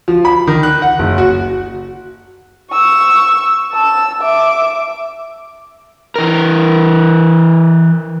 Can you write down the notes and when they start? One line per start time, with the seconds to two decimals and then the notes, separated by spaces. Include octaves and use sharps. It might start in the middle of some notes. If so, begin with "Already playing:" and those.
0.08 F3
0.25 B5
0.47 D#3
0.63 F#6
0.82 F#5
0.99 F#1
1.18 F#4
2.71 C#6 E6
3.73 A5 E6
4.21 E5 D6
6.16 E3 A#4